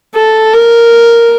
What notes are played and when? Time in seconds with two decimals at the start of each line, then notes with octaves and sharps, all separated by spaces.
0.14 A4
0.53 A#4